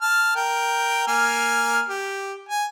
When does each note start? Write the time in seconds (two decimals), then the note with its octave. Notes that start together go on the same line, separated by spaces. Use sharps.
0.02 A5 F6
0.36 A#4 G5
1.08 A#3 G#5 F6
1.88 G4
2.49 G#5